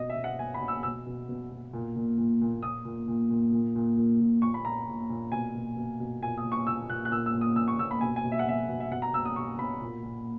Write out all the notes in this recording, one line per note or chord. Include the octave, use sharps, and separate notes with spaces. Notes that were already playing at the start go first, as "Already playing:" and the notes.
Already playing: B2 D#5
E5
B2
F#5
B2 G#5
B5
B2
E6
B2 E6
B2
B2
B2
A#2
A#2
A#2
A#2
A#2 D#6
A#2
A#2
A#2
A#2
A#2
A#2
A#2
A#2 C#6
B5
A#2 A#5
A#2
A#2
B2 G#5
B2
B2
B2
A#2 G#5
D#6
A#2
C#6
A#2 E6
A#2 F#6
F#6
A#2 E6
E6
A#2
D#6
A#2 E6
C#6
A#2 E6
B5
B2 G#5
G#5
B2
E5
F#5
B2 E5
B2
E5
B2 F#5
A#5
B2 E6
D#6
B2 C#6
B2 B5
A#2
A#2